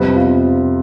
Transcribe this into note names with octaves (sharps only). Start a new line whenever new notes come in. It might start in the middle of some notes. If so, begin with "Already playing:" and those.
Already playing: F2 C3 G3 B3
F4